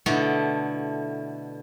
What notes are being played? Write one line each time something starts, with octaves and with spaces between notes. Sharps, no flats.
B2 D3 A3 E4 A4